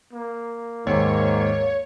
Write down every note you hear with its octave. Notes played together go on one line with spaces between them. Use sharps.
A#3
D#2 G#2 C#5